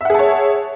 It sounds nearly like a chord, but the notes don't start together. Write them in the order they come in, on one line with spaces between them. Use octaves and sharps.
E5 F#5 G#4 A5 C#5